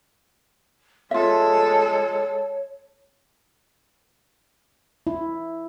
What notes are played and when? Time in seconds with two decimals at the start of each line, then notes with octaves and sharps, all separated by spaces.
1.11 G#3 F4 A4 C#5 E5
5.07 E4